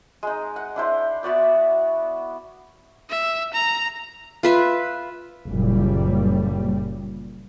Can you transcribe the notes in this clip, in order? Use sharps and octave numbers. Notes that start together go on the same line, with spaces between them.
G#3 D#4
F#5
D4 E4 C5
B3 F#4 D5 E5
E5
A#5
F4 B4 E5
F#1 A#2 G3